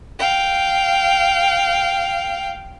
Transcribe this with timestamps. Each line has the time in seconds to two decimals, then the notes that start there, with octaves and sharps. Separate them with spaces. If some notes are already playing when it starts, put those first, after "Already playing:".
0.19 F5 G5